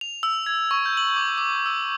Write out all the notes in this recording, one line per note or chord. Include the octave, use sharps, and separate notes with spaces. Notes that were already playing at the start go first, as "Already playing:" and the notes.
F7
E6
G#6
C#6
G6
F#7
D6
D6
E6